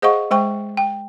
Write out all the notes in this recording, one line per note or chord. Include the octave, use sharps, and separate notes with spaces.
G#4 C5 D#5 F5 F#5 C#6
G#3 C5 G5 C#6
G5